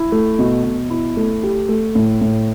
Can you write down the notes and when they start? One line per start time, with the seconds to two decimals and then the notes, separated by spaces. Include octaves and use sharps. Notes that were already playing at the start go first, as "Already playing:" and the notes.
Already playing: E4
0.12 A3
0.39 B2
0.64 B2
0.90 E4
1.17 A3
1.43 G4
1.69 A3
1.95 A2
2.21 A2